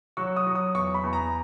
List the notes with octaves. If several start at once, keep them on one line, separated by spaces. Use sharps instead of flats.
F#3 C#6
D#6
F#3
D#6
E2 C#6
B5
E2
A#5